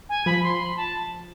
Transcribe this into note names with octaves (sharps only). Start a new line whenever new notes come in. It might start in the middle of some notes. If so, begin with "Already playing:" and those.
G#5
F3 B5
C6
B5
A5